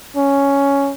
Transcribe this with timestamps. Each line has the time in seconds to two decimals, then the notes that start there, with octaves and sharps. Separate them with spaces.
0.16 C#4